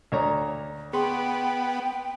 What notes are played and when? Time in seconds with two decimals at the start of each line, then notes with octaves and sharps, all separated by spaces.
0.12 D2 C#5 A#5
0.93 B3 G#4 G5 C6